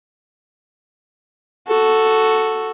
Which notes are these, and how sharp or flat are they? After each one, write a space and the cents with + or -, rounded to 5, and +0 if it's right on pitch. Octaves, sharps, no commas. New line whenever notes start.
F#4 +0 A4 +0